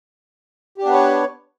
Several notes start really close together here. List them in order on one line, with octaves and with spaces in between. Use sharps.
G4 D4 B3 B4 C#5